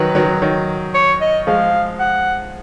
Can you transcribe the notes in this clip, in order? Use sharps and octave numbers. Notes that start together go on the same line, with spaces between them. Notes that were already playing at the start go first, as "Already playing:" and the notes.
Already playing: D#3 F#3 B4
D#3 F#3
D#3 F#3
C#5
D#5
F3 G#3 F5
F#5